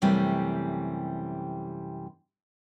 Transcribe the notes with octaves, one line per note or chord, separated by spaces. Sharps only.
F#2 C3 E3 G3 A3